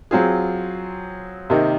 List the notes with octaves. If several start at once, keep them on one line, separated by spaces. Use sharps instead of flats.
F#3 C4 F4 G#4
C3 D#3 A#3 D#4